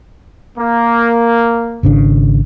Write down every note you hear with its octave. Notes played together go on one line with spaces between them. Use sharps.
A#3
G#1 C#3 D4